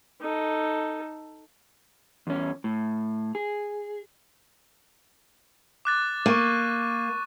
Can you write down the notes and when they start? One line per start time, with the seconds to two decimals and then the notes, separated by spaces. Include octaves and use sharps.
0.22 D#4 A4
2.27 E2 C#4
2.64 A2
3.35 G#4
5.85 D6 F#6 A6
6.26 A#3 C#6 D#7